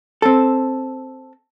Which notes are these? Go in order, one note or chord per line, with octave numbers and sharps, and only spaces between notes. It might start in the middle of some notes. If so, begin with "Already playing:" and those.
C4 A4